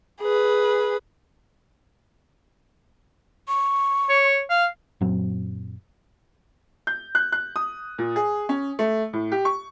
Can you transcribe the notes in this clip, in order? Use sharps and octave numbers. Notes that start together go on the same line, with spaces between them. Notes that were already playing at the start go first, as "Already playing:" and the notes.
G#4 B4
C#6
C#5
F5
F#2 A#2 F#3 C4
G6
F#6
F#6
D#6
A#2
G#4
C#4
A3
A2
G4
C#6